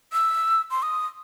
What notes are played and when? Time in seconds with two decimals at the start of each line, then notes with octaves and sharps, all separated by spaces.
0.13 E6
0.71 C6
0.82 D#6